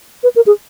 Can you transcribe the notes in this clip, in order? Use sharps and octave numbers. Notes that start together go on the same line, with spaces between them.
B4
A#4
G#4